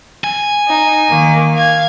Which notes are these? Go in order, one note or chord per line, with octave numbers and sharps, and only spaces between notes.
G#5
D#4
D#3 A#3
F5 G#6